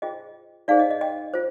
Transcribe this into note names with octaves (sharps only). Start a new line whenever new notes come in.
F4 G#4 C5 D#5 G5
D#4 G#4 C5 D5 F5
D#5
D#5
D#5 G5
F4 C5